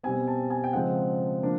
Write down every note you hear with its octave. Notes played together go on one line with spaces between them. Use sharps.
B2 G3 C4 G#5
A5
G#5
G5
C#3 F3 G#3 C4 F#5
F3 A#3 D4